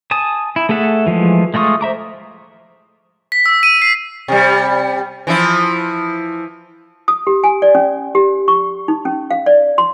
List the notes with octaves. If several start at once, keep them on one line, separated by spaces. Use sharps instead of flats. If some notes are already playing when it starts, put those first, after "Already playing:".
G#5 A5 D#6
E4
A3 G#4 A4 E5 F#5
E3 F3 G#3 A3
G#3 A3 F4 C#6 D#6
C5 E5 A#5 D6
B6
E6
D#7
C7
C3 G3
E3 F3 E4
D#6
G4
G#5
D5
C#4
G4
C#6
D#4
C#4
F5
D5
C6